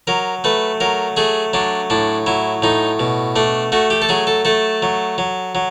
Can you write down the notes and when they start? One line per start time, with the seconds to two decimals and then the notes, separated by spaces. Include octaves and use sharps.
0.07 F#3 A#4
0.44 A3 B4
0.80 F#3 A#4
1.17 A3 G#4
1.53 F#3 D4
1.90 A2 D4
2.26 F#3 E4
2.62 A2 D#4
2.99 B2
3.36 A3 D4
3.72 A3 F#4
3.90 G4
4.02 A4
4.09 F#3 G#4
4.27 A4
4.45 A3 A4
4.82 F#3
5.18 F#3
5.55 F#3